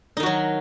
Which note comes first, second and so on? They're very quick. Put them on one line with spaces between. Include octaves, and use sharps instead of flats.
D#4 D#3 F#4 F#3